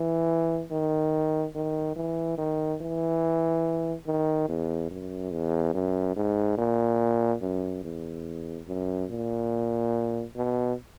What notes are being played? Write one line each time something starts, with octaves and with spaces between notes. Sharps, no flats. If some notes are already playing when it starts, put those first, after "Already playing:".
Already playing: E3
D#3
D#3
E3
D#3
E3
D#3
E2
F#2
E2
F#2
G#2
A#2
F#2
E2
F#2
A#2
B2